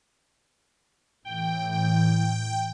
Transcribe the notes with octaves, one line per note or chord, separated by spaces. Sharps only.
A2 E3 G5
G5